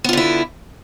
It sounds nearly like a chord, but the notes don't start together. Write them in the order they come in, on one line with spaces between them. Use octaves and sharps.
B3 F4 D3 E4